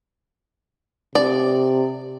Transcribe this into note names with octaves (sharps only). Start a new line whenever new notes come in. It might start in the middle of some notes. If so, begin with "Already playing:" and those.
C3 D5